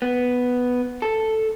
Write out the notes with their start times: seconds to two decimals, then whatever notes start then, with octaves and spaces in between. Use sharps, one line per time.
0.02 B3
1.02 A4